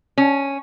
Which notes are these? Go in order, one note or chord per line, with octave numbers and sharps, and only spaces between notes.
C#4